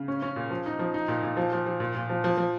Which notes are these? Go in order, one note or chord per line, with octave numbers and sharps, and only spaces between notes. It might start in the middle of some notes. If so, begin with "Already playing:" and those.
Already playing: C#3
C#4
C#4
A#2
F3
D#4
F3
D#4
A#2
A#2
F3
F3
F3
A#2
A#2
F3
F3
F3